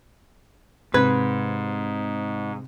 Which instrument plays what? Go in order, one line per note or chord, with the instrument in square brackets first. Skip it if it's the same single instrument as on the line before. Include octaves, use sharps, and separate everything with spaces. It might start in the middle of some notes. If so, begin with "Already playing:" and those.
[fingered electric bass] G#2 [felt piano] C3 G#6 [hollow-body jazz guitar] B4